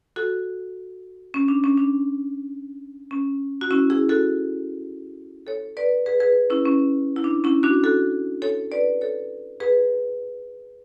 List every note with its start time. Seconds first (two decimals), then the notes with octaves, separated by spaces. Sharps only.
0.16 F#4 A4
1.34 C#4
1.48 D4
1.64 C#4
1.78 D4
3.11 C#4
3.61 F#4
3.71 C#4 E4
3.90 E4 G#4
4.09 F#4 A4
5.47 A4 C#5
5.77 B4 D5
6.06 G#4 B4
6.20 G#4 B4
6.50 C#4 E4
6.66 C#4
7.16 E4
7.24 D4
7.44 C#4 E4
7.63 D4 F#4
7.84 F#4 A4
8.42 A4 C#5
8.72 B4 D5
9.01 A4 C#5
9.60 G#4 B4